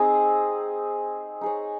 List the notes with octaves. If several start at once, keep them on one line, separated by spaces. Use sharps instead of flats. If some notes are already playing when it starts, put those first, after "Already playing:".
Already playing: C4 D#4 G#4 D#5
D#4 G#4 C#5